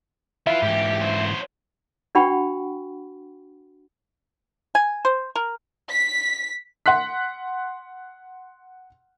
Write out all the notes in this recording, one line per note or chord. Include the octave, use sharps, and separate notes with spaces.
E4 F4 B4 E5
G#2 E3 G4
F#3 C5
D4 F#4 F#5 G5 B5 C#6
G#5
C5
A#4
B6
F#5 C6 F#6 B6